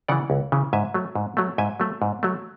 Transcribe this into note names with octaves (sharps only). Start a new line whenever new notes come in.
C#3 E3 D5 F#5
C#2
C#3 E3
G#2 E5 G#5
F#3 A3
G#2
F#3 A3
G#2 E5 G#5
F#3 A3
G#2
F#3 A3